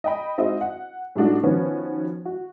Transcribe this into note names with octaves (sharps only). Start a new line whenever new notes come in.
D#5 G5 B5
G#3 C4 D#4 F#4 D#5 E5
F#5
A2 G3 A3 D4 D#4 F#4
D#3 F3 B3 C#4 F#4 B4
F#4